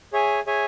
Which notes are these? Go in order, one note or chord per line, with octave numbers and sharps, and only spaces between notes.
G#4 C#5 E5 G#5
G#4 C#5 E5 G#5